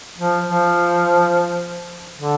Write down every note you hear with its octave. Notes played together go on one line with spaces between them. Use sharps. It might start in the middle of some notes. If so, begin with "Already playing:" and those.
F3
F3
D3